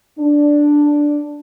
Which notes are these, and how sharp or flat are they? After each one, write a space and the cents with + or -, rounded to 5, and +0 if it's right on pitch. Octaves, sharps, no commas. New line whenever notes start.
D4 +0